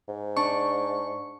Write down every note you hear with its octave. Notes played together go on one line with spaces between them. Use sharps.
G#2
D4 C#6